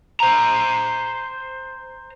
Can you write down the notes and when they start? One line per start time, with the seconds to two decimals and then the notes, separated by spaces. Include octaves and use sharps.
0.20 C5 A#5